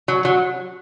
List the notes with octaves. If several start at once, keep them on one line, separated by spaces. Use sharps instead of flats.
F#3
F#3